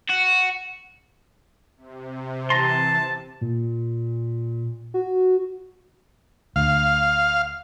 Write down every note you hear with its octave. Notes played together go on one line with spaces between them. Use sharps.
F#4
C3
E3 A5 A#5 C6
A#2
F#4
D2 F5